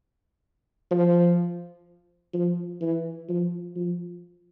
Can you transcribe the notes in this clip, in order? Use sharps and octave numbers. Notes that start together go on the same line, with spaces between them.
F3
F3
E3
F3
F3